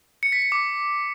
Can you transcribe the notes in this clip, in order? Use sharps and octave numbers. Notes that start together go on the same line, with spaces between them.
C#7
B6
C#7
D6